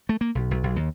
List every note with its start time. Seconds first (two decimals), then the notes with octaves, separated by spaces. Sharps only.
0.09 A3
0.21 A#3
0.35 B1
0.51 B1
0.63 B1
0.76 D#2